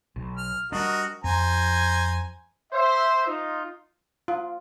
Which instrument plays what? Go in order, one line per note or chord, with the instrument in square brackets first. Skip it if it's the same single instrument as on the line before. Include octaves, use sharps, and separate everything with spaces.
[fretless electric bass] B1
[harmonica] F6
[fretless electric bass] G3 D4 [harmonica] F#4 A#4 D#5
[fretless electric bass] F2 [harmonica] C5 G#5 A#5
[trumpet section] C5 E5
D#4 F4
[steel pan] F4